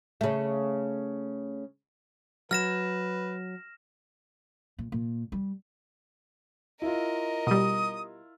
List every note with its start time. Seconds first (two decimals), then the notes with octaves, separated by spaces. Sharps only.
0.21 C#3 A3
2.51 F#3 B4 F6 A#6 E7
4.79 A#2
4.92 A#2
5.32 G3
6.82 E4 F4 A#4 D#5
7.47 B2 G3 D#6